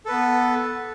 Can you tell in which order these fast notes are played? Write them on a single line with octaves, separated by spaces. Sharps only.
A4 B4 B3